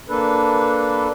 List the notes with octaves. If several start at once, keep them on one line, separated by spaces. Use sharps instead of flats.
A#3 D4 A4 B4